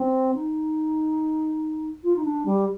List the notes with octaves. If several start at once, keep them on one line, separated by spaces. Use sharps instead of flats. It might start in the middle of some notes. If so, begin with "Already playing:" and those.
Already playing: C4
D#4
F4
D#4
D4
G3